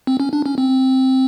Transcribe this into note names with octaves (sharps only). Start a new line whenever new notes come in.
C4
C#4
D4
C#4
C4